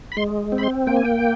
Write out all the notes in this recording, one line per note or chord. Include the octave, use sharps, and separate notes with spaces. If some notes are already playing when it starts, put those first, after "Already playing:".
B5
G#3 C6
C4
B5
C6
A#3 G5
G#5
G5